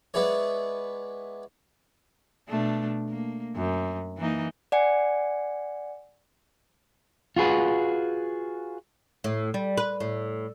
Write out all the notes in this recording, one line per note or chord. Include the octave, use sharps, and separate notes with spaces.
G#3 B3 D4 E4 G#4 C#5
B2 A3 D4
A#3
F#2
E3 A#3 D#4
D5 F#5 G#5 C#7
F4 F#4 G#4 B4
A2
G3
B4
A2